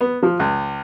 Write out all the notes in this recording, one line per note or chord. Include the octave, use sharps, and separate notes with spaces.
B3
F3
C#2